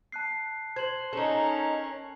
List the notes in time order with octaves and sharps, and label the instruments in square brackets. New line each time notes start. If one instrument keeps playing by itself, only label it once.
[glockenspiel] A5 F#6 C7
[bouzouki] C5 [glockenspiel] G#6 F#7
[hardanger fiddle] C#4 A#4 [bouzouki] D#4 A4